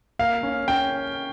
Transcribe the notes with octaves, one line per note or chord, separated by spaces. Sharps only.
A#3 F5
C#4
C#4 G5